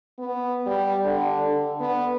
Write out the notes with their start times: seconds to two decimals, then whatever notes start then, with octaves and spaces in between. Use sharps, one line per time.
0.19 B3
0.66 G3
1.05 D3
1.46 D3
1.80 B3